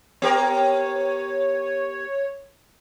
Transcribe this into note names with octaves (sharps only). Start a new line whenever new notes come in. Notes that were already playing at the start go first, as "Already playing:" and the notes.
B3 G4 A#4 C#5